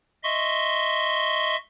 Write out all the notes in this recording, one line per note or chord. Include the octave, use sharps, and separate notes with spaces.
D#5 E5 C6 C#6